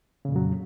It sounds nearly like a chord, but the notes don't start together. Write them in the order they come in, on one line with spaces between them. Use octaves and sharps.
C#3 A#2 F2 F#3